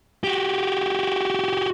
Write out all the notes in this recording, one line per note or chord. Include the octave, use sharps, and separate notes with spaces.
F#4 G4